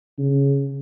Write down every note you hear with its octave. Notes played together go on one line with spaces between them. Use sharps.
C#3